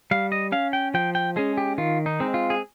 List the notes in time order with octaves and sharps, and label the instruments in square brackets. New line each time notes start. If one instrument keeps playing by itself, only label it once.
[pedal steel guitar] G3 F5
D#5
C#4 F5
G5
F3 G5
G5
G#3 C#4 G#4
G4
D#3 F4
D#4
G#3 C4
F4
G#4